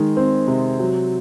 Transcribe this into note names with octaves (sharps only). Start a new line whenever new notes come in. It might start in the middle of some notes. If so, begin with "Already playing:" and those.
Already playing: D#3 G#3
C4
C3
F#3